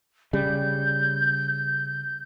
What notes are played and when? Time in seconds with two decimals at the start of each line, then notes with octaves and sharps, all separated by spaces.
0.33 C#3 G3 G6